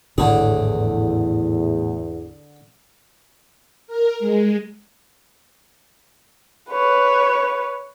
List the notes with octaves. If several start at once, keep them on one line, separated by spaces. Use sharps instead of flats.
G#1 E2 A2 D3 G#4
A#4
G#3
B4 C#5